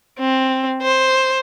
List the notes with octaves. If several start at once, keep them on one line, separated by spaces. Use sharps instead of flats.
C4
C5